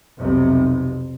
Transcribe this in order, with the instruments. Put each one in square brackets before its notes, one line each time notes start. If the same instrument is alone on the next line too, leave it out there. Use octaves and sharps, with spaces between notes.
[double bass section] B1 F2 C3